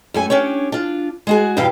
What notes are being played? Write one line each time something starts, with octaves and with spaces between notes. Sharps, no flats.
F#2 A3 G#5
C#4 D4 G4 C#5
D4 F4
G#3 F#4 G#4
E2 G2 B2 G4 F5